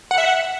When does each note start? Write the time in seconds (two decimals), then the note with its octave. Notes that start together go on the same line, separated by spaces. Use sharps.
0.11 F#5
0.18 E5
0.25 F#5